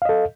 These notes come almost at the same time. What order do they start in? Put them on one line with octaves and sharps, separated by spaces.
F5 D#5 A4